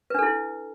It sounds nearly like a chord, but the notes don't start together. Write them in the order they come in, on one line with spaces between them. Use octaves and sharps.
B4 D4 A4 E4